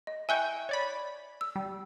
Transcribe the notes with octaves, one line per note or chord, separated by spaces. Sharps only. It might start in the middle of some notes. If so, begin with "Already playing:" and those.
D#5
E4 G5 G#5 C#6 F#6 G6
C#5 D5 B5
E6
G3